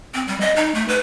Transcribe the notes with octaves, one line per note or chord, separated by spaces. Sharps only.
C4
G3
D#5
D#4
A3
B4